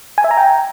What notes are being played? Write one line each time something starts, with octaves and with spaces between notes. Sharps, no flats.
G#5
E5
A#5
G5